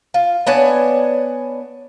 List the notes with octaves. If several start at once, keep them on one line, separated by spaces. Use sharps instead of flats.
F4
B3 D4 C#5 G#5